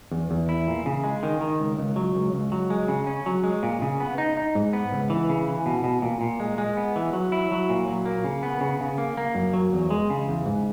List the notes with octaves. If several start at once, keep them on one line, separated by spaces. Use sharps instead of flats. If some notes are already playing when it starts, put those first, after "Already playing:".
E2
E2
E4
A#2
C#3
G#3
D#3
D#3
C#2
C#2
F#3
C#2
C#2
F#3
G#3
C#3
C#4
F#3
G#3
A#2
C#3
B3
D#4
D#4
G#2
B3
C#2
E3
C#3
E3
B2
B2
A#2
A#2
G#3
G#3
B3
E3
F#3
E4
F#3
A#2
F#3
A#3
C#3
B3
C#3
C#3
A#3
A#3
F#2
F#3
E2
G#3
C#3
E2
G#2